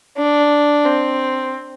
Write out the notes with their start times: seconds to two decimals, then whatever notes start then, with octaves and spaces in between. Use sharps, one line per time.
0.18 D4
0.85 C4